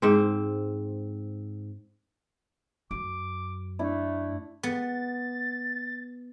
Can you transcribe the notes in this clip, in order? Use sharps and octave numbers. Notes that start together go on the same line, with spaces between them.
G#2 C4
F#2 D6
A3 D4 E4
B3 A6